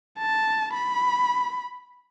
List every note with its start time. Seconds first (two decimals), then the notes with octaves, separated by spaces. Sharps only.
0.19 A5
0.74 B5